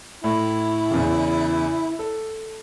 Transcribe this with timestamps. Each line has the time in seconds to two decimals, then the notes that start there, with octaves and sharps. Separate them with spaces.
0.24 A2 E4
0.91 E2 C#3
1.99 A4